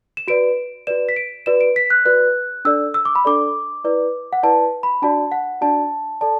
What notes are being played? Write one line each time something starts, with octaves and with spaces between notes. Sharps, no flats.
E7
F#4 B4 D5 D7
F#4 B4 D5 E7
B6
D7
F#4 B4 D5 E7
D7
B6
F#6
F#4 B4 D5 F#6
D4 A4 D5 E6
E6
D6
B5
D4 A4 D5 D6
E4 B4 D5
F#5
E4 B4 D5 A5
B5
D4 F#4 D5 A5
F#5
D4 F#4 D5 A5
A4 D5 A5